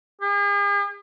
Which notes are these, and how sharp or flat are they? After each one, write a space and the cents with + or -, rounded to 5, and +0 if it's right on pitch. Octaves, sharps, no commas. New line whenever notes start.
G#4 -45